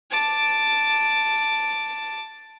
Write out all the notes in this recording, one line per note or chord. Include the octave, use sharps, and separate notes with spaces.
A5 D6